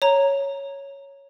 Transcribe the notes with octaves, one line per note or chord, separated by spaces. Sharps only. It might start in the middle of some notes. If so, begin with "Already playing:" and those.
C#5 A#5